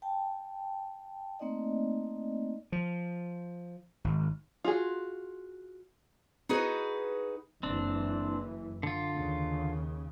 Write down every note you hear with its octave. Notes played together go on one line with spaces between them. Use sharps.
G5 A5
A3 A#3 C4 D#4 D5 D#5
F3
G#1
F4 F#4 G#4
D#4 F#4 G#4 B4
F#1 E3 C4 D4
D3 F4
D#2 C#3